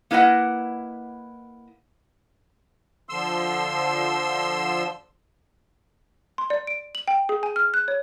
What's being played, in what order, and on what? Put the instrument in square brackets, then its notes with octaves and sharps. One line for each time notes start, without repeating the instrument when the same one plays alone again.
[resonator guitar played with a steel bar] A#3 E4 B4 D#5 F#5
[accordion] D3 F3 C6 E6
[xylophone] C6
D5
D7
F#7
G5
G#4
G#5
F6
F#6
C#5